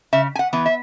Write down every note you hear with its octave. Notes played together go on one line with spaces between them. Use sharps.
C#3 E5
G#5
F#5
E3 B3
E5